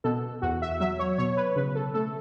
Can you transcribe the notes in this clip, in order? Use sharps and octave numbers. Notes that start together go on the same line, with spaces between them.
B2 A4
E2 F#4
E5
F#3 E5
C#5
B2 C#5
B4
C#3 B4
A4
A3 A4